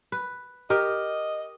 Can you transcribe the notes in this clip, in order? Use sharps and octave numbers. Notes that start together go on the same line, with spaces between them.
B4
G4 A#4 D#5